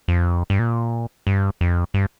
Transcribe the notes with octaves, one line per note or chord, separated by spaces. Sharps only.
F2
G2
A#2
G2
F2
G2